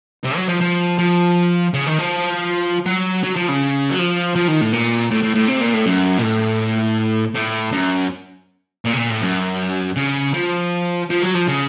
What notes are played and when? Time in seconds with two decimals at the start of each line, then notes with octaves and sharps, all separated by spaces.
0.24 C3
0.37 F#3
0.49 F3
0.61 F3
0.99 F3
1.74 C#3
1.86 D#3
1.98 F3
2.86 F#3
3.23 F#3
3.36 F3
3.48 C#3
3.90 F#3
3.99 F3
4.35 F3
4.48 D#3
4.61 A2
4.73 A#2
5.11 A2
5.23 A2
5.35 A2
5.48 C3
5.61 A#2
5.73 A2
5.86 F#2
6.18 A#2
6.22 A2
7.35 A2
7.72 F#2
8.85 A#2
8.93 C3
8.97 A#2
9.10 A2
9.22 F#2
9.97 C#3
10.34 F3
11.10 F3
11.22 F#3
11.34 F3
11.47 C#3